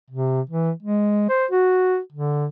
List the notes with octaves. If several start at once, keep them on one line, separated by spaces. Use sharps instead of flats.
C3
E3
G#3
C5
F#4
D3